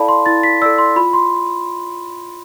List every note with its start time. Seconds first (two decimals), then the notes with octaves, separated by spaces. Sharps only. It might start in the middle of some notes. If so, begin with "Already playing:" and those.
Already playing: E4 A4 D5 F5 A5 B5
0.09 C6
0.26 E4 A6
0.43 B6
0.62 A4 D5 E6
0.78 C6
0.96 F4 B5
1.13 C6